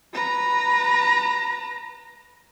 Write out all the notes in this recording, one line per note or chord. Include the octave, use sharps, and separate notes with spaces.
B4 A#5